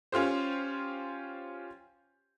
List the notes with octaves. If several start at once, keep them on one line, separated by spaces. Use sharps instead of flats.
C#4 F4 G4 C5